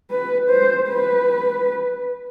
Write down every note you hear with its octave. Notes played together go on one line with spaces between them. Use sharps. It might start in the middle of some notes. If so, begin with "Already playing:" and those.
B4
C5
B4